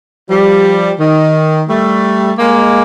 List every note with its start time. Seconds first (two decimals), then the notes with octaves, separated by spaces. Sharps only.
0.29 F3 G3
0.99 D#3
1.69 G3 A3
2.38 G#3 A#3